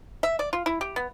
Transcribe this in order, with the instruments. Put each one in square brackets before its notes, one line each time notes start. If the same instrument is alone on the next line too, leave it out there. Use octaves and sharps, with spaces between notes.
[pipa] E5
D5
F4
E4
G4
B3